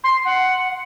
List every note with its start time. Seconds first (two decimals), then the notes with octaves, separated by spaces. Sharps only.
0.04 C6
0.25 F#5